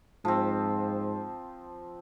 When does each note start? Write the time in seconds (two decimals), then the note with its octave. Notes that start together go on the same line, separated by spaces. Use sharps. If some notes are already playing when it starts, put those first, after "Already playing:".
0.25 G#2 F3 C4